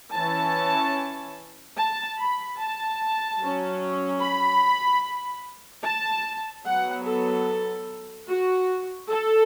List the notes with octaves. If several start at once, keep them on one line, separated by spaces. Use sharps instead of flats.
E3 C#4 A5
A5
B5
A5
F#3 C#4
B5
A5
F#3 B3 F#5
A4
F#4
A4